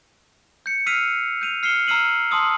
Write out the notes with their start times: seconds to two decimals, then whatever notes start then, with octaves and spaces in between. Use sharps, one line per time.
0.66 G6 C#7
0.87 E6 F6 B6 C7 D#7 F7
1.41 G6 D#7 F7
1.63 F6 C7 C#7 E7 G7
1.88 A#5 E6 F6 C7 D#7 F#7
2.31 A5 C6 D#6 E6